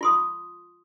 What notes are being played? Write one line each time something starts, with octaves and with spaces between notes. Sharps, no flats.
F4 C6 D#6